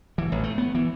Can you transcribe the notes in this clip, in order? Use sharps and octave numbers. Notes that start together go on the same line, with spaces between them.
E3
A1
A3
B3
E3